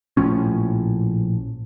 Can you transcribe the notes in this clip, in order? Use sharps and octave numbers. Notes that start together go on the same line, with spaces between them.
A#1 A2 F3 C#4